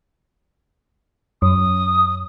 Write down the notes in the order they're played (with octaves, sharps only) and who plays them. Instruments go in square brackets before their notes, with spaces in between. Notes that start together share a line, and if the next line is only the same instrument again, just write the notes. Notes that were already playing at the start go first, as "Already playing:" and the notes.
[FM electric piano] F#2 [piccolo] D#6